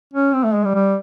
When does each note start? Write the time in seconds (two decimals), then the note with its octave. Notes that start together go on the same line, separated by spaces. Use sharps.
0.14 C#4
0.34 C4
0.44 A3
0.54 G#3
0.65 G3
0.75 G3